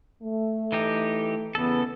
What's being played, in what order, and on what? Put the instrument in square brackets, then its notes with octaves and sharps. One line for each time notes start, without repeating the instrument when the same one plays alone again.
[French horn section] A3
[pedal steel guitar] E3 D#4 G4
[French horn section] E2 [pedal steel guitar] C#3 A4 [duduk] B3